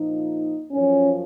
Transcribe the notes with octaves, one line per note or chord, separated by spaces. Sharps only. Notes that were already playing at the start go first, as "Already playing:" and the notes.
Already playing: A#2 F3 D#4
F#2 F3 C#4